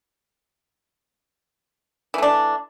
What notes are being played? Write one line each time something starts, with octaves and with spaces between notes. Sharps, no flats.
E3 A3 D4